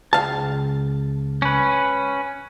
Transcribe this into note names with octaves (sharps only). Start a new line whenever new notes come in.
C#2 F5 A5
C#4 B4